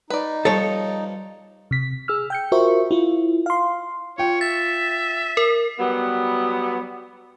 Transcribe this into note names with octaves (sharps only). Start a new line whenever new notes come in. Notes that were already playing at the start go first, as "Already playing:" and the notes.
D#4 B4 D5
G2 F3 A4 C#5
C3 B6
G#4 E6 F6
G5 G6 C#7
F4 F#4 A#4 C5 E5 C#6
E4 F4
F5 C6
F4 C#5 G5
E5 A6
A#4
F#3 G3 B3